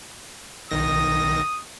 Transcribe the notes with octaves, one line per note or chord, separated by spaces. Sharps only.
B1 D#3 D#6 A#6